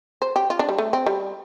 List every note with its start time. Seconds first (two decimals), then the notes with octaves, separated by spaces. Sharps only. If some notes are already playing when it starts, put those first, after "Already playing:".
0.22 C5
0.36 G4
0.50 F4
0.59 D4
0.69 G3
0.78 A3
0.93 C4
1.06 G3